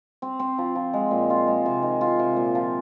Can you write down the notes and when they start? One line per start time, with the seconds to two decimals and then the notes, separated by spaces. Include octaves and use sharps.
0.22 C4
0.39 C4
0.58 F3
0.75 F3
0.93 G#3
1.11 A#2
1.30 F4
1.47 G#3
1.66 C3
1.82 D#3
2.01 F4
2.19 C3
2.37 A#2
2.55 F3